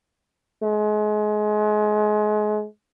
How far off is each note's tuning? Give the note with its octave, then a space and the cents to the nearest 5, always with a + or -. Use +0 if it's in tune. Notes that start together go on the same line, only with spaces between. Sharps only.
G#3 +30